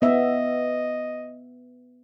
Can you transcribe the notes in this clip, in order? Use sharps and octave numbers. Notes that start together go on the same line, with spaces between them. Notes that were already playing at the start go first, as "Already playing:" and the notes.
B3 D#5 E5